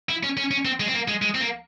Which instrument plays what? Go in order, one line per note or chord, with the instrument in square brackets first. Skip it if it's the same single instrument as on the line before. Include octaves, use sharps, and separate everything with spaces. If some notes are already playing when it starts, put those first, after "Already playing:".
[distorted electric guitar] E4
C#4
C#4
C#4
C4
G#3
C4
A#3
G#3
G#3
C4
A#3